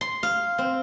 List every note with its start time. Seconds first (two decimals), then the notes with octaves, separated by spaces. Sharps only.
0.01 C6
0.23 F5
0.58 C4